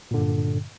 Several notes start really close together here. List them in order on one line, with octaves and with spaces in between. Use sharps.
A#2 D3 G2